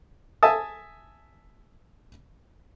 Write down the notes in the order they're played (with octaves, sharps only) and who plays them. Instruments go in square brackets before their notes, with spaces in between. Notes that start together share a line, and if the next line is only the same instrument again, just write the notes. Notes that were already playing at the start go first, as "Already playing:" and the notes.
[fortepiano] E5 G#5 A5 D#6